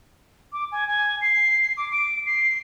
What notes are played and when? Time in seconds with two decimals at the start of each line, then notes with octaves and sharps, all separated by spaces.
0.53 D6
0.72 G#5
0.88 G#5
1.22 C7
1.77 D6
1.92 D7
2.26 C7